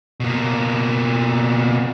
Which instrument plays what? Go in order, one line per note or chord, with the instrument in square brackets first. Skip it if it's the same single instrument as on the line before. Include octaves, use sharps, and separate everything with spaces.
[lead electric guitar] B2 A#3